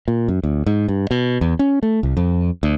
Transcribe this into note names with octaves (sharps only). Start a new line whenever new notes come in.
A#2
F#2
D2
G#2
G2
B2
E2
C#4
A3
C2
F2
D2